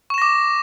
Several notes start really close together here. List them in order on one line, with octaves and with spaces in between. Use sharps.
C#6 E7 A#6 D6